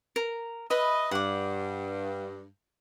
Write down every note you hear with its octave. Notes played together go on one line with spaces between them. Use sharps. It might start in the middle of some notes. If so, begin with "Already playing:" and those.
A#4
B4 D#5 E5 B5
G2 F#5 D6